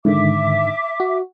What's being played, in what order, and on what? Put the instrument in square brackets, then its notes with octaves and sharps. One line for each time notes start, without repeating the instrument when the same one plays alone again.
[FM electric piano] G#2 D3 D#3 [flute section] E5 D6
[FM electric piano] F#4